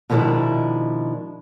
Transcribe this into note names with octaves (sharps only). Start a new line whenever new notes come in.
B2 D#3 F3 G#3 D4 E4